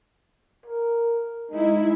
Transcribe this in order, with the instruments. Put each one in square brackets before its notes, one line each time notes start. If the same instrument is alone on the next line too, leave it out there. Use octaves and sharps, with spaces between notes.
[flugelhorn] A#4
[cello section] G#3 E4 [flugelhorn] D#4